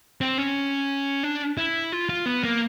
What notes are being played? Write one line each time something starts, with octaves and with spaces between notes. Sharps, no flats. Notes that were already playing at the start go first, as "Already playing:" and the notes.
C4
C#4
D4
E4
F4
F4
B3
A#3